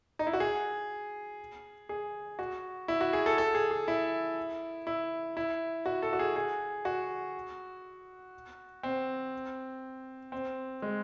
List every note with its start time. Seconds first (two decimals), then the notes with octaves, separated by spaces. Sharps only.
0.19 D#4
0.27 E4
0.33 F#4
0.40 G#4
1.89 G#4
2.39 F#4
2.88 E4
3.01 F#4
3.13 G#4
3.26 A4
3.38 A4
3.55 G#4
3.71 G#4
3.88 E4
4.87 E4
5.37 E4
5.86 F#4
6.02 A4
6.13 F#4
6.19 G#4
6.36 G#4
6.85 F#4
8.83 C4
10.32 C4
10.82 G#3